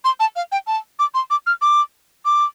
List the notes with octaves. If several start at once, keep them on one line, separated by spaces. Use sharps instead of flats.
C6
A5
F5
G5
A5
D6
C6
D6
F6
D6
D6